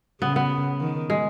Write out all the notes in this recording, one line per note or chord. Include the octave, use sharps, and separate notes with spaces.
C#3 B3
B3
D#3
G#3